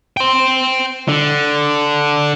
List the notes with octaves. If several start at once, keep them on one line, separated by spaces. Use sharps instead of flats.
G5 C6
D3